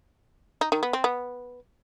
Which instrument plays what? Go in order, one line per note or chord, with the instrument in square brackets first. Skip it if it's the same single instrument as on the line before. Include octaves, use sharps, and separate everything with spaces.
[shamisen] D#4
D#3
B3
C4
B3